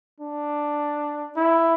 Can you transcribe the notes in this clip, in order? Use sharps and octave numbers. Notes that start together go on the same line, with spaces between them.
D4
E4